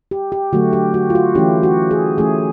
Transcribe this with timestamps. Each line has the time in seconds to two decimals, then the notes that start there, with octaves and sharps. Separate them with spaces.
0.11 G4
0.32 G4
0.53 D3 F#3 A3 F#4
0.73 G4
0.94 F#4
1.10 F4
1.15 F#4
1.35 E3 A3 C#4 E4 G4
1.63 F#4
1.91 G#4
2.18 E3 A3 C#4 E4 G#4